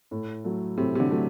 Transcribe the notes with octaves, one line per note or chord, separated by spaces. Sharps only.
A2
F#3 A3
A2 C3
C3
D3
F#3 A3